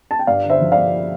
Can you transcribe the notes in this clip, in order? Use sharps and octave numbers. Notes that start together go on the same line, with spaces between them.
A5
G5
G2 D5 F5
D3
C5 E5
F3
D5 F5
G2